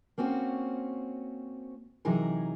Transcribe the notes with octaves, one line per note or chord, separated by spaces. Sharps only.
A#3 C4 C#4 F#4
C3 E3 F#3 D#4 G#4 A#4